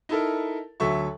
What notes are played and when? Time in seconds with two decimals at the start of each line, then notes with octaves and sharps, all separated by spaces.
0.09 D#4 E4 A4 A#4
0.80 D2 F#3 A4 E5 C#6